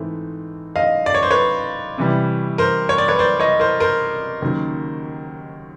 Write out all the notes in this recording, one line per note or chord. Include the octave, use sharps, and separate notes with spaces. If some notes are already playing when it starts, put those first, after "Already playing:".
Already playing: G#2 E3 A3 C4
D#5 F5
D5
C#5
C5
B4 C#5
C3 E3 G3
A#4 C5
C#5
D5
B4 C#5
C5 D5
C#5 D#5
A#4 C5
A#4 C5
D#2 C#3 F#3